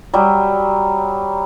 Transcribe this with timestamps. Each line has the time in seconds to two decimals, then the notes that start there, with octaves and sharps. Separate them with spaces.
0.14 F#3 G3